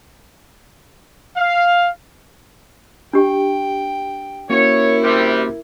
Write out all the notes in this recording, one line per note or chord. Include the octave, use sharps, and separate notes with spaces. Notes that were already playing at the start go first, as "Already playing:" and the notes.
F5
D4 G4 G5
A#3 C#4 E4 F#4 A#4 C#5
C3 G3